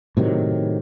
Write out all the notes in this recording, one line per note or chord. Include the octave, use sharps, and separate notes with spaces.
A2 C3 D#3 F#3